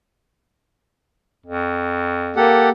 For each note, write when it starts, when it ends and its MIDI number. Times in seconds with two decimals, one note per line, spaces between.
1.46 2.52 41
2.36 2.70 58
2.36 2.69 67
2.36 2.69 69
2.36 2.69 78